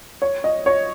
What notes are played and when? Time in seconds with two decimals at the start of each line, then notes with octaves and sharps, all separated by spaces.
0.22 C#5
0.44 D#5
0.66 C#5